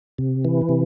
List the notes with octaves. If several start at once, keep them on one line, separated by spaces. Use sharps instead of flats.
C3
E3
C3